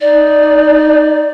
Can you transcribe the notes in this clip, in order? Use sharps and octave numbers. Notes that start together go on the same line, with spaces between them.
D#4 D5